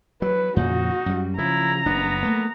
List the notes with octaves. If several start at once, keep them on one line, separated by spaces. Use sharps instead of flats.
F#3 B4
F2 A#2 C#3 D#4 F#4
F#2 G3
C#3 F3 E4 A#5
F#1 B3 D4
A3 A#3